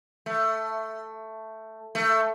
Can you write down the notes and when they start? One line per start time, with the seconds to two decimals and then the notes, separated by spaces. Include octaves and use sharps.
0.26 A3
1.95 A3